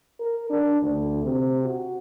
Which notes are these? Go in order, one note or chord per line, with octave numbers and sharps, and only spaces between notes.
A#4
D4
D2
C3
F#4